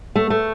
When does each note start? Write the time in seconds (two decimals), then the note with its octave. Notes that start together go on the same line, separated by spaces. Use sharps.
0.16 A3
0.30 A3